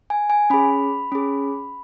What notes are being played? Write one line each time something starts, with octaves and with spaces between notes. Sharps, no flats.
G#5
G#5
C#4 G#4 B5
C#4 G#4